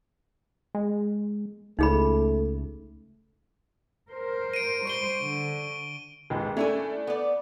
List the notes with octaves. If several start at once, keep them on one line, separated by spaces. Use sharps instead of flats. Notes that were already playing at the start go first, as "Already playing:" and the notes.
G#3
C#2 A3 D#4 G#4 B5
A#4 C5
D7 D#7
G3 C5 C#6 D7 G7
D3
A1 D#2 G#3
A3 C#4 D4 E4 G#5
B3 D5